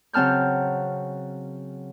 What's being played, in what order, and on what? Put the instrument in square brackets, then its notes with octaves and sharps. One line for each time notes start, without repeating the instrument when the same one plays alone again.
[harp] C#3 F#3 C4 A5 F6 G6